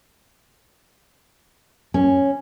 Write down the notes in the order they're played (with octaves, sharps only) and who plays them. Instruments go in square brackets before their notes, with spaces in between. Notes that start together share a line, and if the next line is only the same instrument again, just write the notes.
[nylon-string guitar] C#4